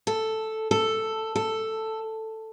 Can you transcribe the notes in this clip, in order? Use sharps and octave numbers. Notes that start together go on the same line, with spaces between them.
A4
A4
A4